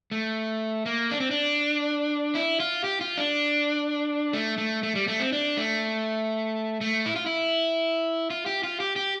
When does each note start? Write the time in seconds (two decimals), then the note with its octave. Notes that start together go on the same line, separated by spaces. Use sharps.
0.11 A3
0.86 A#3
1.11 D4
1.20 C4
1.31 D4
2.35 E4
2.60 F4
2.84 G4
3.01 F4
3.17 D4
4.33 A3
4.58 A3
4.83 A3
4.95 G3
5.08 A3
5.20 C4
5.32 D4
5.57 A3
6.81 A3
7.06 E4
7.16 F4
7.26 E4
8.30 F4
8.46 G4
8.63 F4
8.80 G4
8.96 G4